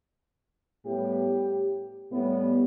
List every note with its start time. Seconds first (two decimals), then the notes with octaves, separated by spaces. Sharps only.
0.85 A2 G3 B3 G4
2.10 A2 G3 B3